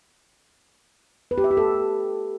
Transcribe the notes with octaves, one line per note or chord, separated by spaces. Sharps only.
B4
G4
E5
G4
A4